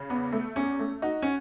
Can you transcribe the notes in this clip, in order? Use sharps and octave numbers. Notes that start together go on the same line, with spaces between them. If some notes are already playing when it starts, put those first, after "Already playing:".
Already playing: C#3
E2 B3
A3
E2 C#4
A3
D#4 F#4
C#4